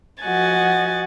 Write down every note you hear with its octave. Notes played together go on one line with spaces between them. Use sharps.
F3 F#4 D#5 F#5 G#5 A6